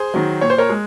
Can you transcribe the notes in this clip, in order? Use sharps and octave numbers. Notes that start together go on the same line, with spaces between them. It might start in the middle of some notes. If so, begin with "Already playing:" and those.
Already playing: G#4 C5
D#3 F#3
A#2 C#5
C5
A#4 C#5
G#3